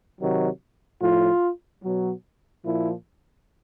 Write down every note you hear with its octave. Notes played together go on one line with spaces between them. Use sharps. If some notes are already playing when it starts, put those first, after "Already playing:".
C3 D#3 F#3
A2 F3 F4
B2 F#3
A#2 F3 E4